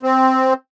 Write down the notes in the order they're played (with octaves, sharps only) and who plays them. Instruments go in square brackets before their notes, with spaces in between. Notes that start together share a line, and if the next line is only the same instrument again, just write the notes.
[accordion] C4